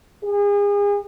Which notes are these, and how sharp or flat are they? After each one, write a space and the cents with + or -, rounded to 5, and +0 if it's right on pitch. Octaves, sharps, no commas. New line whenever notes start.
G#4 -35